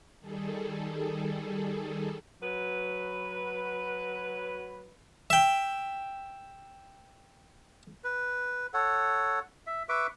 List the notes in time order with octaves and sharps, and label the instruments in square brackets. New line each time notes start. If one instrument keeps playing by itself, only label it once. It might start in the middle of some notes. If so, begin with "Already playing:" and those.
[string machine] D#3 G3 G#4 A4
[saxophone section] F#3 B4
[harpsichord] E5 G5
[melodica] B4
A4 C#5 F#5
E5
B4 E5 C#6 D6